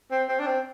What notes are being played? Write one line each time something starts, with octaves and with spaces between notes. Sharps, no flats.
C4
C4
D4
C4